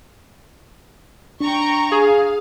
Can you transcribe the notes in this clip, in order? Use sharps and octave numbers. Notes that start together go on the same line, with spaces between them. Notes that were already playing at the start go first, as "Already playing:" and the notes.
D4 G5 A#5 C#6
G#4 F5